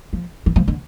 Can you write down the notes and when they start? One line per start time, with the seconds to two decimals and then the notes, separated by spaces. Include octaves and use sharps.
0.13 F3
0.46 E3
0.56 F3
0.68 D3